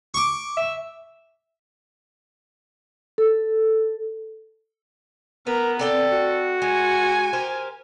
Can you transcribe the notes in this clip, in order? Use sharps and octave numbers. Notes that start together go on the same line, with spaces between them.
C#6 D6
E5
A4
B3 A#4 B4
C4 A4 D5 G5
F#4
G#3 G#5
G4 A#4 C5